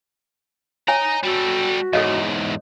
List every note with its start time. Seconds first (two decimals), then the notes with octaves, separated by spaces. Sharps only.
0.88 C#5 D#5 G#5 A#5
1.24 G3 F#4 A4
1.93 E2 G#2 A4 C#5 D#5